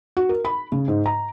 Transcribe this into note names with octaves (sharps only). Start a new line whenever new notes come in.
F#4
A#4
B5
C#3
G#2
A#5